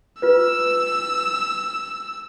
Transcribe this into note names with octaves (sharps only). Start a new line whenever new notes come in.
F4 B4 E6